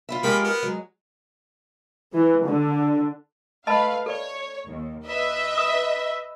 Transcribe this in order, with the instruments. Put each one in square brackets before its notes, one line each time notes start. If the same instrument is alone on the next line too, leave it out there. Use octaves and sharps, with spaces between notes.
[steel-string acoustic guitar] F4 B4 E5
[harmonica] F3 B5 [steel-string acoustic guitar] G#3 F4 G4 [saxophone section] A#4
[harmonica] B3
[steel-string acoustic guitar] F#3 G#3
[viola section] E3
D3
[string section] A3 B4 F5 [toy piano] D#5 A5 B5
[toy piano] A4 D5 [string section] C#5
[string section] D#2
B4 D#5 E5
[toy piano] D#6